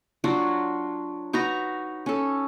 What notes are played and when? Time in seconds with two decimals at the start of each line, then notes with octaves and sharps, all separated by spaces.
0.24 F#3 D4 F4 F#4
1.33 D#4 F#4 B4 A#5
2.06 C#4 A4